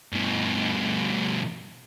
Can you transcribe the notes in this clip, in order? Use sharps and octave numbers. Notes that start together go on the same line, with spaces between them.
G2 B2